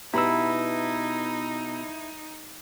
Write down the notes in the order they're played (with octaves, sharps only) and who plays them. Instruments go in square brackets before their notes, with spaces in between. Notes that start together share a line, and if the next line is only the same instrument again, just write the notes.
[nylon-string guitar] B2 B3 G4 [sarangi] D#4 [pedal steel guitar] E4 [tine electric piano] A#5 B5 E6